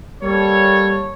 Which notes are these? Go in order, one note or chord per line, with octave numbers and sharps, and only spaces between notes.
G3 A#3 A4 C#5